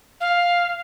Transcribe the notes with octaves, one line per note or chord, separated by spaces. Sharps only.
F5